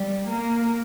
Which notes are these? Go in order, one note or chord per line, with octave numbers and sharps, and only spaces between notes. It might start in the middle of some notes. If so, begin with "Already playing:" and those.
Already playing: G3
A#3